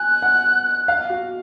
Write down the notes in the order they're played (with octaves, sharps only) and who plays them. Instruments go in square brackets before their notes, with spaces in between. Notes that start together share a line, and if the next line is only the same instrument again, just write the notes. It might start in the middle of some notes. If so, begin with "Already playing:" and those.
Already playing: [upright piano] G#5 [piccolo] F#6
[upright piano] F#5
F5
F#4